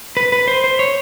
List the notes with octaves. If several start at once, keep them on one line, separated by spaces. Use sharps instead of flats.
B4
B4
C5
C5
C#5